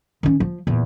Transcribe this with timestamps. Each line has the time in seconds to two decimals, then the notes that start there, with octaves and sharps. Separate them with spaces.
0.23 D#3 C#4
0.40 F3
0.67 E2 A#2